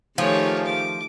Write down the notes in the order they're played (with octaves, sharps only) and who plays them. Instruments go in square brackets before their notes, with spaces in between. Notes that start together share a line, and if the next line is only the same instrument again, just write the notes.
[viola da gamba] D#3 A3 G4 [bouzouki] F3 [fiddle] G#4 C#5
[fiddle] D6